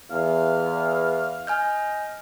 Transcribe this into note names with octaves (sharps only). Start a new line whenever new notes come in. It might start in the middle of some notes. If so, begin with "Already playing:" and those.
E2 F5
D#5 G#5 F6 G6